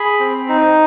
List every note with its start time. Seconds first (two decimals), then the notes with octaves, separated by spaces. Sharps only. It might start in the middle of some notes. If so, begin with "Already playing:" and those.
Already playing: G#4 B5
0.20 C4
0.49 D#4